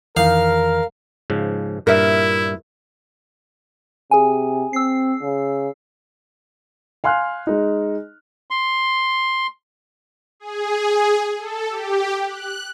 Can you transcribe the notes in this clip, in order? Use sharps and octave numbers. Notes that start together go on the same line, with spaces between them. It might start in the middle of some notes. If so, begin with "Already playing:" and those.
F2 D#3 E3 A#4 F5
G#2 C#3 F3
G2 A#2 E4 A#4 E5
C3 G#4 G#5
C4 E6 C7
C#3
F5 G#5 C6 F6 F#6
G#3 D#4
C6
G#4
A4
G4
F#6